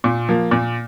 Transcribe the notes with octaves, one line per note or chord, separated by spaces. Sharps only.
A#2
F3 A#3
A#2